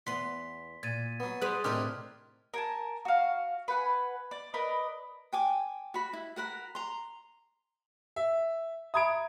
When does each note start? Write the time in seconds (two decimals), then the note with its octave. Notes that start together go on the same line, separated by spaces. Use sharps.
0.07 E2 B3 C6 B6
0.83 A#2 G#6 A6 D#7
1.20 F#3 B3
1.41 G3 G#4 B4 C6 D#6 F#6
1.64 A2 C3 D#3 C4 D4 G4 D6 F6
2.54 A#4 G#5 A5
3.05 F#4 F5
3.68 B4 F#5 G#5
4.31 D5
4.54 A#4 B4 D5 D#5
5.33 G5 G#5 D6
5.94 F#4 B5
6.13 E4
6.36 F#4 A#4 F#5 B5
6.75 A#5 C6
8.16 E5
8.94 E5 A#5 B5 D#6 G#6 D7